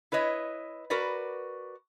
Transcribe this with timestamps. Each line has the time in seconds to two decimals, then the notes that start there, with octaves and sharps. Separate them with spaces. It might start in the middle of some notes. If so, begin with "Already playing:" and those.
0.12 E4 B4 C#5 D#5
0.90 F#4 A#4 B4 D5